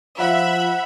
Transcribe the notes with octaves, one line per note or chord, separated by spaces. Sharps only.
F3 F4 E5 F#5 B5